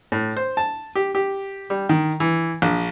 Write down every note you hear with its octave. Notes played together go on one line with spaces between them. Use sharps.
A2
C5
A5
G4
G4
G3
D#3
E3
A#1